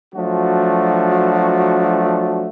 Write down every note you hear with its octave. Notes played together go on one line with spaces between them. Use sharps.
F3 F#3 A3 D4 F#4